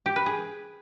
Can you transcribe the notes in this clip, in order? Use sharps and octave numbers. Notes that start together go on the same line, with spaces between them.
G4
B4
G#4